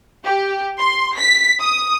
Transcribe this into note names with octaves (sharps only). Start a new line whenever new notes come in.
G4
C6
B6
D#6